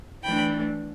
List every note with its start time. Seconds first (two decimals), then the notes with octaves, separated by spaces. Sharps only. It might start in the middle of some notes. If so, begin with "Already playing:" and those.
0.23 E3 A3 D4 G5 B5